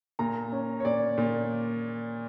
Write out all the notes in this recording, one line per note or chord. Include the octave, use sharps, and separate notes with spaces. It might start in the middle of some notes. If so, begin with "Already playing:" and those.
A#2 A#5
C#4
C#5
A#2 D5
A#2